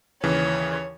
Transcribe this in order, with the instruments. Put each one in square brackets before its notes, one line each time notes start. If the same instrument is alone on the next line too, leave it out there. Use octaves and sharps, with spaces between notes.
[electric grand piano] D#2 C#3 E3 [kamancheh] C#5